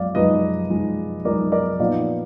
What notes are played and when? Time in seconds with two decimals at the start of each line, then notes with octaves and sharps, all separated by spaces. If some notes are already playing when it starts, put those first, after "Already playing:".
Already playing: F#2 F3 G#3 D5 F5
0.15 F#2 F3 G#3 D#4 B4 D#5
0.70 F#2 F3 G#3 D#4
1.25 F#2 F3 G#3 D#4 A#4 D5
1.52 A#4 D5
1.79 A#2 F3 B3 D#4 D5 F5